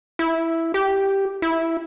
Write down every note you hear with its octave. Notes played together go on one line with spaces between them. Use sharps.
E4
G4
E4